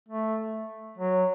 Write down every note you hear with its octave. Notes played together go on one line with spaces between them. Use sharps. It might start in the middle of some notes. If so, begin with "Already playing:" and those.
A3
F#3